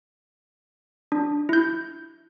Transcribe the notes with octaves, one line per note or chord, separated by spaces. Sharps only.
D4
E4 G6